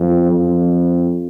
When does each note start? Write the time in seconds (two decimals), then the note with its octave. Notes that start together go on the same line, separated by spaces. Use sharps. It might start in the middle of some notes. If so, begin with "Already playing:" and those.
Already playing: F2
0.31 F2